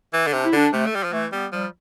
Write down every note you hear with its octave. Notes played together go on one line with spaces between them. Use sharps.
E3
D3
C3 D4
E4
D3 D4
C3 A3
A3
G3
F3
E3 A3
G3 B3
F3 G3